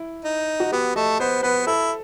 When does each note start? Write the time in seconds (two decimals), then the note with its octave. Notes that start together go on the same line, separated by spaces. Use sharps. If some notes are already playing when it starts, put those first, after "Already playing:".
Already playing: E4
0.25 D#4
0.60 F#4
0.72 B3 G4
0.96 A3 D#5
1.20 B3 C5
1.43 B3 B4
1.67 E4 A4